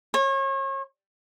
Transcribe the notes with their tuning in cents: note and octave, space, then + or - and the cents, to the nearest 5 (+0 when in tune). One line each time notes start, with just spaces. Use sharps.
C#5 -35